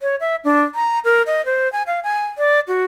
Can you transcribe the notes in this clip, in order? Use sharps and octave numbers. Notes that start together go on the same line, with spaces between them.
C#5
E5
D4
A#5
A#4
D#5
C5
G#5
F5
G#5
D5
F#4